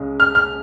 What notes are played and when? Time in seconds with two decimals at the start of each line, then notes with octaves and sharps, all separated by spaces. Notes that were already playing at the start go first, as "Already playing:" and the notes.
Already playing: C#2 C#3 G#3 C#4
0.20 F6
0.35 F6